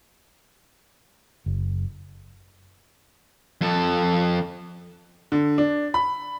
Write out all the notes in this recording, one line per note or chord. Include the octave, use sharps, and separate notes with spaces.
F#1
F2 A4
D3
D4
B5